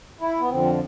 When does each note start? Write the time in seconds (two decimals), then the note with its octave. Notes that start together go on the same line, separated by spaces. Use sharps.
0.21 E4
0.40 B3
0.49 F2 D3 F3 C4